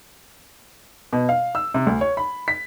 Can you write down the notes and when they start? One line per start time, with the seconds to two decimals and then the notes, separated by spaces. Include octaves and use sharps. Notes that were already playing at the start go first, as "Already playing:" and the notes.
1.13 B2
1.29 F5
1.55 E6
1.74 C3
1.87 D2
2.01 C#5
2.17 B5
2.48 B6